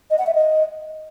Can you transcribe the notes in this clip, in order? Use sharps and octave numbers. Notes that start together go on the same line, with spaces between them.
D#5
F#5
E5
D#5